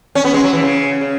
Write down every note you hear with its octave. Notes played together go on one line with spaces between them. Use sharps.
C#4
B3
G#3
F#3
E3
C#3
C#3